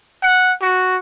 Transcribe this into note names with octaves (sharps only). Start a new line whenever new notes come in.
F#5
F#4